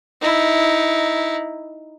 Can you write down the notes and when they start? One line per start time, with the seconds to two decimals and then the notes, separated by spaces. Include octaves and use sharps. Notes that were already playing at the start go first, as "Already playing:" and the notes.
0.21 D#4 E4